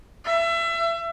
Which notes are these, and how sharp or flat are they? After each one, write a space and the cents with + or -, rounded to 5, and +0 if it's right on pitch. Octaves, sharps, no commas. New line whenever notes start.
E5 +30